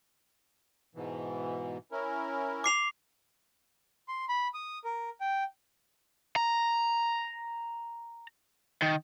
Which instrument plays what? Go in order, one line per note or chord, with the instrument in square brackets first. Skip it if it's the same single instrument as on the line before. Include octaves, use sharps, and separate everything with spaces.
[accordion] G#2 B2 E3
C#4 E4 A#4
[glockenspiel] D6 C7 F7
[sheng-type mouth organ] C6
B5
D#6
A#4
G5
[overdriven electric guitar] A#5
D#3